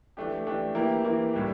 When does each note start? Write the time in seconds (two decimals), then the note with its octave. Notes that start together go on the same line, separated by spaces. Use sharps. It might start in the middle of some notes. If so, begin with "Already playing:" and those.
0.17 E3 A3 D4 G4
0.46 E3 A3 D4 G4
0.75 E3 A#3 E4 G4
1.04 E3 A#3 E4 G4
1.33 A2 G3 D4 G4